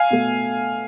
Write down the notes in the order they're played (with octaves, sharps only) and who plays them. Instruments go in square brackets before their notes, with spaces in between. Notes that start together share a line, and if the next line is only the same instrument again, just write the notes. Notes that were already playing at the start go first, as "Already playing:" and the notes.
Already playing: [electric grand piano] F5 G#5
[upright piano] B2 A3